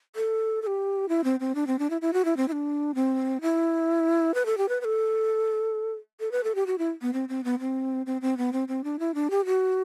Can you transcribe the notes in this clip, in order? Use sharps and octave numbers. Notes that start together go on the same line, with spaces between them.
A4
A4
G4
E4
C4
C4
D4
C4
D4
E4
E4
F#4
E4
C4
E4
D4
C4
E4
B4
A4
G4
B4
B4
A4
A4
B4
A4
G4
F#4
E4
B3
C4
C4
B3
C4
C4
C4
B3
C4
C4
D4
E4
D4
G4
F#4